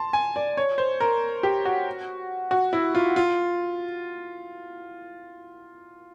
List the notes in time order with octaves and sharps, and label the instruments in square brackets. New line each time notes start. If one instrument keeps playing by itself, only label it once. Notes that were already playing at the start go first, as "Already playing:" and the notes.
Already playing: [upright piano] A5 C6
G#5
D5
C#5
C5
A#4
G4
F#4
F#4
E4
F4
F4